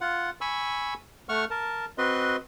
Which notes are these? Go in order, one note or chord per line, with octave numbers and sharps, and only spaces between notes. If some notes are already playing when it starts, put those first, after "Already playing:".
F4 F#5
G#5 B5 C#6 E6
A3 F#5 C#6 F6
A#4 A5
C4 F#4 B4 D#5 C6